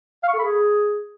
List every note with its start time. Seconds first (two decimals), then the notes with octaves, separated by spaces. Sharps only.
0.23 F5
0.28 C#6
0.33 A4
0.38 B5
0.44 G#4